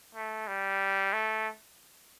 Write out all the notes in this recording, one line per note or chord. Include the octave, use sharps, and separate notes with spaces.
A3
G3
A3